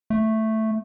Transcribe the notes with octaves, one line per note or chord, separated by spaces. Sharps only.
A3